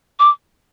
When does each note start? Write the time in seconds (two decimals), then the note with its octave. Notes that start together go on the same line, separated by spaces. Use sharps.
0.19 D6